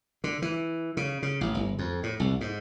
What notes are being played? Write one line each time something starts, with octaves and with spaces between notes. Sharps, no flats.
D3
E3
C#3
C#3
A1
G1
F2
A2
C2
G#2